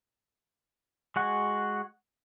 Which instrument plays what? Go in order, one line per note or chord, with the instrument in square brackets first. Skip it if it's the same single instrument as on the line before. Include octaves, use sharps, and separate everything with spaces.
[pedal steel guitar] G#3 F#4 F#5